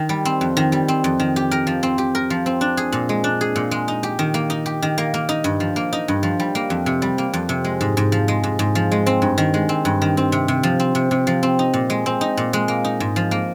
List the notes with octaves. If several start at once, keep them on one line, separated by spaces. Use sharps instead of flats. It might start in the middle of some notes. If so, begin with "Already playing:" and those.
Already playing: D#3
G3
C4
F2
D#3
G3
C4
F2
D#3
G4
A#4
F3
C4
G4
A#4
F3
C4
D4
G#4
A#2
G#3
D4
G#4
A#2
G#3
D#4
G4
D#3
A#3
D#4
G4
D#3
A#3
A#3
D#4
G2
F3
A#3
D#4
G2
F3
G3
A#3
F2
C3
G3
A#3
F2
C3
G#3
G#2
G#2
F3
G#3
G#2
G#2
F3
G#3
C4
G2
D#3
G#3
C4
G2
D#3
C4
C3
C3
F3
C4
C3
C3
F3
C4
D#4
A#2
G#3
C4
D#4
A#2
G#3
A#3
D#4
G#2
F3
A#3